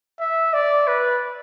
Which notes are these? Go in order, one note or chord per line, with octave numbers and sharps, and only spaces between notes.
E5
D5
B4